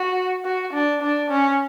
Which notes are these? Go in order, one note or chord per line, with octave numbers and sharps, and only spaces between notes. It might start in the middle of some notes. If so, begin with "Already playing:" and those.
Already playing: F#4
F#4
D4
D4
C#4